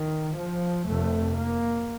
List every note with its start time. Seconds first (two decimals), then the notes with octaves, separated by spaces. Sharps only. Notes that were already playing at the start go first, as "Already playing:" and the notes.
Already playing: D#3
0.37 F3
0.87 F1 F2 C3 A3
1.37 A#3